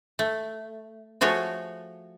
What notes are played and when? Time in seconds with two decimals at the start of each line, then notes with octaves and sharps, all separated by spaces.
0.19 A3
1.21 F3 A3 F#4 G#4 C#5